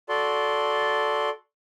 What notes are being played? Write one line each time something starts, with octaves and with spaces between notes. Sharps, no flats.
F#4 A4 D5 C6